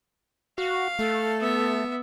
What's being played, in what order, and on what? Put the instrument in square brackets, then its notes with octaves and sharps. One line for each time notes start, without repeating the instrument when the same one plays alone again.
[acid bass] F#4 [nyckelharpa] F5
[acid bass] A3 [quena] A4
[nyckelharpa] B3 E5